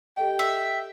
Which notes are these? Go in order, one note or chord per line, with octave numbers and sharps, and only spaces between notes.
G4 A4 D#5 G5
E5